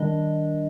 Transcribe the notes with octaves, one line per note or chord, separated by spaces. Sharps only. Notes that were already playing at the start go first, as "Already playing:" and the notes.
Already playing: D#3 G3 D4 D#5